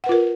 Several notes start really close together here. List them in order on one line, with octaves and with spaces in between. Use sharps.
F#5 B4 F4 A#4